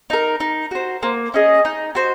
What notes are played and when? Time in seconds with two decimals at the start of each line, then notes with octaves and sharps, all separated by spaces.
0.10 D#4 A#4
0.40 D#4
0.71 F#4 C5
1.02 A#3 C5
1.34 C#4 G#4 D#5
1.65 D#4
1.95 F#4 C5